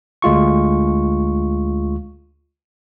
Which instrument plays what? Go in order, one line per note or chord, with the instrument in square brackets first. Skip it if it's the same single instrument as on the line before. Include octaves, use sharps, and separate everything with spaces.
[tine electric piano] D2 G#3 F4 C#6